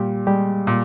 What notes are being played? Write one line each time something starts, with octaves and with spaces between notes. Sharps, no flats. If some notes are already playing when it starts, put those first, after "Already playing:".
Already playing: A#2 G3 G4
G3 G#3 G4
A#2